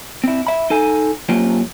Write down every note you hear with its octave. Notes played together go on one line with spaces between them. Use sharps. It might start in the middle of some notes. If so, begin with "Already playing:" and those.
C4 E4
E5 B5
D#4 A4 G#5
F#3 A#3 C4 C#4 F4 G4